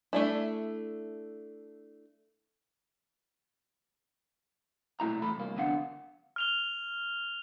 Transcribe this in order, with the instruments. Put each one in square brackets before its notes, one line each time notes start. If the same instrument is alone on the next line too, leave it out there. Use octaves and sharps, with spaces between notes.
[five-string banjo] A3 D4 E4
[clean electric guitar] B1 A#2 A3 E4 A#5
E2 A3 A4 B5
C2 A#3
F2 D3 B3 D4 F5 F#5
[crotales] F6 F7 G7